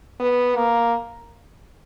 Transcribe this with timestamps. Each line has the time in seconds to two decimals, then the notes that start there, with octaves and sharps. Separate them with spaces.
0.20 B3
0.56 A#3